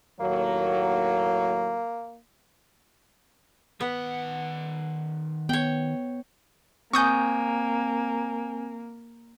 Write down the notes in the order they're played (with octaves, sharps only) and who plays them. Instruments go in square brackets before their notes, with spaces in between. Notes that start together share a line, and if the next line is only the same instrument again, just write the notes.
[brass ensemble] D#2 A2 F#3 [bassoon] A#3
[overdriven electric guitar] D#3 F#5 [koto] B3
[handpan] B3 [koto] C#5 G5
[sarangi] A#3 [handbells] C4 G#5 [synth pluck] C#6 D#6 G6